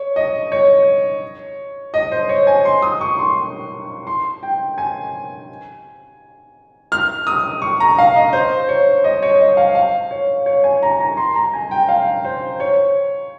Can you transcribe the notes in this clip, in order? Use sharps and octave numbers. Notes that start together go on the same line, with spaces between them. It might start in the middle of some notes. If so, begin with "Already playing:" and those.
Already playing: C#5
D#5
C#5
D#5
C5
C#5
G#5
C6
D#6
C#6
C6
C6
G5
G#5
F6
D#6
C#6
A#5
F5
D#5
C5
C#5
D#5
C#5
D#5
F5
F5
C#5
C#5
G#5
A#5
A#5
C6
A#5
G#5
G5
F5
C5
C#5